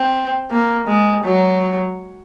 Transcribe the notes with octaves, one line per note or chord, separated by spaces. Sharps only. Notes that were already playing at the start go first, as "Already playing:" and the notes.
Already playing: C4
A#3
G#3
F#3